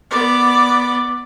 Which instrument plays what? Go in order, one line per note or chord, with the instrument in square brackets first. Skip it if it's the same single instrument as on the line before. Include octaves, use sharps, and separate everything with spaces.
[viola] B3 D5